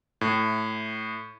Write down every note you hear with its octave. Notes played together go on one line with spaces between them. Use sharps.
A2